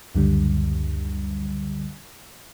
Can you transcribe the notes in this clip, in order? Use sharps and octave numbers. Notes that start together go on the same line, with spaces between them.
C#2 F#2 D3 G3